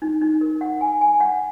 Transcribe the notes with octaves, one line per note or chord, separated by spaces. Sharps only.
D#4
D#4
A#4
F#5
G#5
G#5
F#5